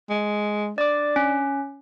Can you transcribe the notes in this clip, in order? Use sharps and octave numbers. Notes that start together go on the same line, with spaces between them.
G#3
D4 D5 D6
C#4